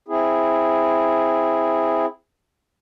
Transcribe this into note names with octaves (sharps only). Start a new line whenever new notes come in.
C4 E4 G#4